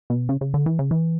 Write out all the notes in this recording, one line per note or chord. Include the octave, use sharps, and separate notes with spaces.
B2
C#3
C#3
D3
E3
C#3
E3